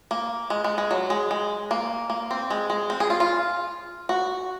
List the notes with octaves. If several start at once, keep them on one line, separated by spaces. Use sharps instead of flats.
A#3
G#3
G#3
G#3
F#3
G#3
G#3
A#3
A#3
C4
G#3
G#3
C4
G#4
F4
F4
F#4